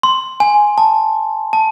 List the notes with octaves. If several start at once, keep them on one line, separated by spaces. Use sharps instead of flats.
C6
G#5
A5
A5